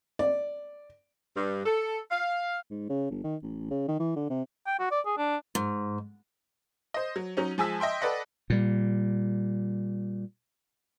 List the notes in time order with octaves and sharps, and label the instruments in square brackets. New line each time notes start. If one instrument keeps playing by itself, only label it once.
[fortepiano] D5
[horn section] G2
A4
F5
[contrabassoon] G#2
C#3
G1
D#3
A1
C#3
D#3
E3
D3
C3
[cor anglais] G5
F#4
D5
G#4
D4
[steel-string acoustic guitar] G#2
[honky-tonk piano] C5 D#5
F#3
F#3 C#4 D#4
F3 G#3 G#5 A5 E6 B6
D#5 E5 G5 C6
A4 B4 D5 D#5 F#5
[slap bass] A#2 G3